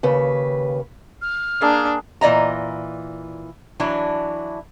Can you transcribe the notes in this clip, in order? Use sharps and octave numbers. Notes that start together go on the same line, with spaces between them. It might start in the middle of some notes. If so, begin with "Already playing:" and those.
D#2 C#3 B4
F6
A#3 D4 G#4 A5
A#2 E3 D5 D#5 A#5
E3 F#3 D4 E4